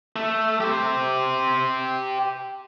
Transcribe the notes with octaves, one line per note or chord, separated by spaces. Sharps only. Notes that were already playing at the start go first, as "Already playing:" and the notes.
A3
G4 C5